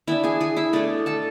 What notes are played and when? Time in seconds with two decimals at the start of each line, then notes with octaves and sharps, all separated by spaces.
0.07 E3 B3 D4 E4 E5
0.24 G#4 G#5
0.41 G#4 G#5
0.56 E4 E5
0.73 B2 A3 D4 E4 D5
1.06 A4 A5